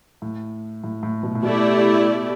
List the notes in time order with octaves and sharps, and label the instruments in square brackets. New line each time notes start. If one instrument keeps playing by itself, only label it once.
[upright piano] A2
A2
A2
B2
A2
[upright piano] B2 [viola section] A3 E4 G4 D5